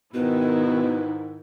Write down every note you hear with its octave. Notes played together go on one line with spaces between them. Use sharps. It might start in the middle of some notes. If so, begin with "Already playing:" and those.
G#2 B2 D#3 E4 B4